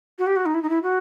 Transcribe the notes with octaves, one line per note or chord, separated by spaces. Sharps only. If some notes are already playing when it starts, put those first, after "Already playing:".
F#4
G4
F#4
D#4
E4
D#4
E4
F#4